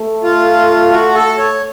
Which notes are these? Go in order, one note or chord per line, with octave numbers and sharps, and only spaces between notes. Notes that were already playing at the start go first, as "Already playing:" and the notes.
Already playing: A3
F4
F#4
A4
C#5